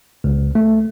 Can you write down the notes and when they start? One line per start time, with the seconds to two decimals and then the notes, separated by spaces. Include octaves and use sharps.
0.24 C#2
0.55 A3